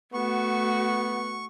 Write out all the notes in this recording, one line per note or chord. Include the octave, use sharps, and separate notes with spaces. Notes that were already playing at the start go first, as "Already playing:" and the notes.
A3 B3 F#4 C#6